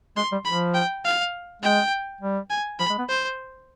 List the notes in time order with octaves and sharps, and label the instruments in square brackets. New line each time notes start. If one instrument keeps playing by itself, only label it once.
[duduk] G#3 [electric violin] C6
[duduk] G3
[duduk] F3 [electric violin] B5
[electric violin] G5
F5
[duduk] G#3 [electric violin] G5
[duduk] G3
[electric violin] G#5
[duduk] F3 [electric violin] B5
[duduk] G#3
B3
[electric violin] C5